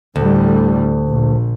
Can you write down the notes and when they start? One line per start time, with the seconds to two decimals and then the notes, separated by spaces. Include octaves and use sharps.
0.16 D2 A2 D3 G3
1.08 A#1